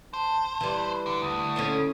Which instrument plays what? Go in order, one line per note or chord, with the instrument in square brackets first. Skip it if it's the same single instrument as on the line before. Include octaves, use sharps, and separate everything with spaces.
[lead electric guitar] C5 [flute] A5
[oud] E3 G3
[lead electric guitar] D3
[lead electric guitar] D2 [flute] D#6
[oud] C#4 A4 C5